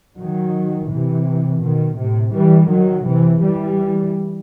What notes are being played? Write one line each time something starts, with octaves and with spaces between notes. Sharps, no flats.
D#3 F#3
C3 E3
B2 D#3
A2 C3
E3 G3
D#3 F#3
C3 E3
E3 G3